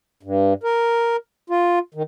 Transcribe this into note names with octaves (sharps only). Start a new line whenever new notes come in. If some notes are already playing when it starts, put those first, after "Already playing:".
G2
A#4
F4
D#3